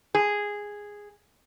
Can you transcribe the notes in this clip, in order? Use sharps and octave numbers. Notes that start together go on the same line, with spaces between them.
G#4